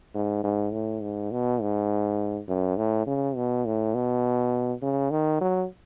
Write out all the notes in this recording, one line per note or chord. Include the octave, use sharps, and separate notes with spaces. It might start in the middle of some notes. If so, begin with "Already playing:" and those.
G#2
G#2
A2
G#2
B2
G#2
F#2
A2
C#3
B2
A2
B2
C#3
D#3
F#3